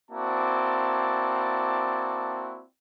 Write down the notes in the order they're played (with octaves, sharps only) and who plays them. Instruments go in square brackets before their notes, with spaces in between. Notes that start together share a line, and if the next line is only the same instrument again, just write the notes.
[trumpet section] A#3 C4 E4 F#4 D5 A5